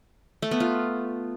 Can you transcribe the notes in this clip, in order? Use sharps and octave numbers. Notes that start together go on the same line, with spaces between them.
A3
B3
F4